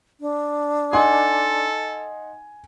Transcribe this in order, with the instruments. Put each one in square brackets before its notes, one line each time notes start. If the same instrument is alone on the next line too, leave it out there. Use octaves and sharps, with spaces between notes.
[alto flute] D4
[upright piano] D#4 F#5 C6 [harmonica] A4 [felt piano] G#5